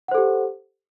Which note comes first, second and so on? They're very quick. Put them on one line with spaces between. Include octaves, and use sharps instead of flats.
F#5 C5 A4 G4